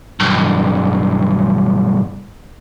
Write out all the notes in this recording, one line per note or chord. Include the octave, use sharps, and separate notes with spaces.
B1 G2